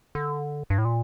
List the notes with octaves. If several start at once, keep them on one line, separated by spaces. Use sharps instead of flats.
D3
G2
A2
A#2